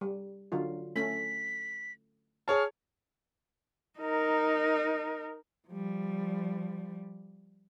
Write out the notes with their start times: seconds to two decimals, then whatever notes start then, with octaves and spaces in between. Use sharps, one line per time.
0.01 G3
0.52 D3 F#3 F4
0.96 A3 C#4 B6
2.48 G#4 C#5 A5 F6
3.99 D#4 A#4
5.68 F3 G3